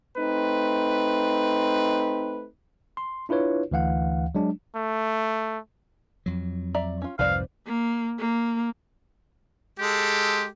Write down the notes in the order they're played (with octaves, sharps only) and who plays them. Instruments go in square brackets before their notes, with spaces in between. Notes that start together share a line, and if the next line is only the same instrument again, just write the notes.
[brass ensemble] A3 C4 D#4 B4
[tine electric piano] C6
D4 E4 F4 B4 C#5
D2 E3 F5 F#5
F#3 G#3 D4
[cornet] A3
[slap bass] F2 F#3
[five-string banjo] D5 E5 A#5
C#4 F4
[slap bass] C2 F2 G#2 [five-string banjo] B4 C5 D5 [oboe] F5
[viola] A#3
A#3
[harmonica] G#3 A4 [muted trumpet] G4